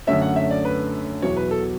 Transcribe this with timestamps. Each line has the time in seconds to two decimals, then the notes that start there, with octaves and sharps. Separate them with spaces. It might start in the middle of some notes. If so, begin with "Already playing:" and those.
0.07 F#2 D3 A3 C#4 E5
0.22 F#5
0.36 E5
0.51 D5
0.65 B4
1.22 E2 B2 F#3 B3 C#5
1.37 B4
1.51 A4